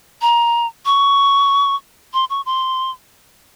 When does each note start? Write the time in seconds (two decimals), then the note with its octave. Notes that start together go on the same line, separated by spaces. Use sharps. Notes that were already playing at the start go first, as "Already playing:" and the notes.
0.22 A#5
0.86 C#6
2.14 C6
2.30 C#6
2.46 C6